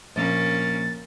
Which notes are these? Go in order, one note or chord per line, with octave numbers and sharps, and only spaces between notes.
A#1 A#3 C#4 A6